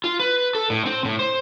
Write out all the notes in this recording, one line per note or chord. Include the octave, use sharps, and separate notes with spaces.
F4
B4
A4
A2
C4
A2
C5